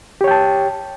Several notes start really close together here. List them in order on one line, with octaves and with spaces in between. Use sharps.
G4 C#5 G5 A5